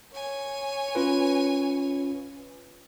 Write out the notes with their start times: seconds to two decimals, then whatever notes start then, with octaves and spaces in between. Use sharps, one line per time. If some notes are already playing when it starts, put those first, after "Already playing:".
0.12 C#5 G#5
0.95 C#4 F4 B4